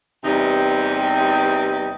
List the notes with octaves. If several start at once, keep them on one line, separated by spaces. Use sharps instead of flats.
E2 C3 E3 G3 D#4